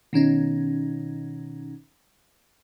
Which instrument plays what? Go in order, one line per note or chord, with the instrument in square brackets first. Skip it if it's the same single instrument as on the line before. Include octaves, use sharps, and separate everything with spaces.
[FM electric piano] B2 D#3 C#4 D#4